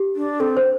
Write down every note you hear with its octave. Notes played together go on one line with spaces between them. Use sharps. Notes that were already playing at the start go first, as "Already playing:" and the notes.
Already playing: G4
D4
C4 A4
C5